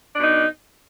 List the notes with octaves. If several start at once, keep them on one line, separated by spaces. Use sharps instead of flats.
B2 D4 D#4